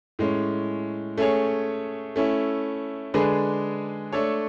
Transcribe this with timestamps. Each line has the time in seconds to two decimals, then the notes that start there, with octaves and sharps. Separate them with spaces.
0.19 A2 G#3 C#4
1.18 A3 C#4 G#4 C#5
2.16 A3 C#4 E4
3.14 D3 G#3 D4 G#4 B4
4.12 A3 D4 A4 C#5